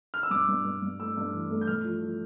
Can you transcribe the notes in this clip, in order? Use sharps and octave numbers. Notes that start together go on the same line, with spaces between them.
F6
E6
G2 D6
G2
G2
G2
A3 E6
G2
E3
A3
G6
G2 F6
F3
F3